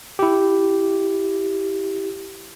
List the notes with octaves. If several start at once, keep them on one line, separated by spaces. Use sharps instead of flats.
E4 G4